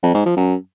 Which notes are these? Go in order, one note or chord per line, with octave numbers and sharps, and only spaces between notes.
F2
G#2
F3
F#2